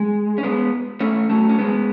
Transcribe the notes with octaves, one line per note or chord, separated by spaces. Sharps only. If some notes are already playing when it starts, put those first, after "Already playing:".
Already playing: G#3
C#4
G#3 B3
A3 C#4
F#3 A3
C#4
G#3 B3